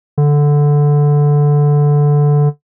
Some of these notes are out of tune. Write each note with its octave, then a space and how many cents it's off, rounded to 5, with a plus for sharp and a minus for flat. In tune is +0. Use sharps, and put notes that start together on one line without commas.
D3 -5